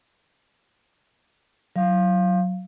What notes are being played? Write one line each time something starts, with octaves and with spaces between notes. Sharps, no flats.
F#3 F5